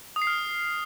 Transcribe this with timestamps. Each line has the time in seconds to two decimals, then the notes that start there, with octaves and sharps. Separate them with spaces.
0.16 D#6
0.22 C7
0.27 F6